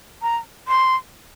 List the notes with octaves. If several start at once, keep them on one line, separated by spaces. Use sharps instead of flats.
A#5
C6